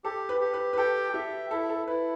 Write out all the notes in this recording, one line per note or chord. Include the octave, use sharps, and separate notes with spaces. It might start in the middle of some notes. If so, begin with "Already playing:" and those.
G4 A4
B4
G4
B4
B4
A4 G5
G4 E5
E4 A4
A4
E4 B4